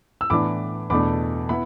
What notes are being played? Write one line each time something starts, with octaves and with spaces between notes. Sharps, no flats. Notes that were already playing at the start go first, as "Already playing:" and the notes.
E6
A2 E3 B3 D4 B5 D6
E2 B2 A3 D4 B5 D6
B3 E4 B5